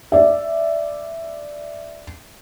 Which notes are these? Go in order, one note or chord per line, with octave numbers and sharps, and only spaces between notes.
D5 E5